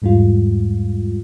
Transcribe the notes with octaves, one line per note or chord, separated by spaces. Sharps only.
E2 G#2 G3 G#3 F4